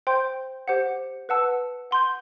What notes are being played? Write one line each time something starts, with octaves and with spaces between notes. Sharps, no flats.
C5 G5 C6 G6
G4 C5 F#5
B4 F#5 A5 E6
F#5 C6 G6